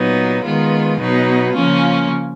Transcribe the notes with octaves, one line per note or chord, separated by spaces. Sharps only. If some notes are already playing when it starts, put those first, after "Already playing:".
Already playing: A#2 F#3 B3 D#4
D#3 G#3 B3 F4
B2 F#3 B3 D#4
C#3 F3 A#3 C#4 F4